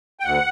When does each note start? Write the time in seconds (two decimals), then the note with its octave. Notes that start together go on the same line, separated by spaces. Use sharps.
0.20 G5
0.24 D2 F#5